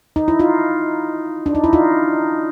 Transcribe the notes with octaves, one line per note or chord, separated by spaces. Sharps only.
D#4
E4
D#4 F4
D4
D#4
E4
D#4 F4